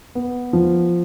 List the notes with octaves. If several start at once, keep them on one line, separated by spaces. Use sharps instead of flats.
B3
F3